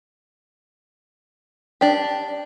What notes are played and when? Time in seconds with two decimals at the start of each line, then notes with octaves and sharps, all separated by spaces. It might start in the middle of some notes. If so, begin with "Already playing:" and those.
1.81 D4 G4